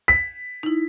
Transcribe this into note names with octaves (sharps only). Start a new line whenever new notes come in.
B6
D#4 E4